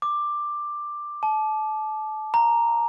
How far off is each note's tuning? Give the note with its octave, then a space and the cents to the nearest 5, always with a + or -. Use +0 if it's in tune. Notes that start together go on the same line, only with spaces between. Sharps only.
D6 +10
A5 -30
A#5 +0